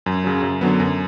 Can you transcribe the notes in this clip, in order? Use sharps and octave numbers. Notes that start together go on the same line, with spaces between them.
F#2
C#3 F#3
F#2
D3 F#3 B3
F#2